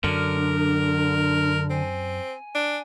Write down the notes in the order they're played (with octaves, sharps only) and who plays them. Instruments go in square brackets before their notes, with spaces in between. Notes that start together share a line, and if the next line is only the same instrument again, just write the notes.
[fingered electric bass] F#2 F#3 [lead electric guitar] D3 [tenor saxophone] A#4 [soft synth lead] F6
[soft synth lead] D4
[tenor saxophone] C4 [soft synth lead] G#5
[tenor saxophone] D4